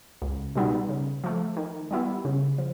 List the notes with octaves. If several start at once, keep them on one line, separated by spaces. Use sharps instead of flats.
C#2
B2 G3 B3 D#4
C#3
F3 A3
D#3
G3 B3 E4 G4
C#3
F3